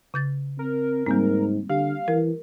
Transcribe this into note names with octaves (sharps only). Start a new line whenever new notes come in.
C#3 G6 A6
C4 A#4
G#2 G3 A#3 C4
D3 G4 F5
E3 A#4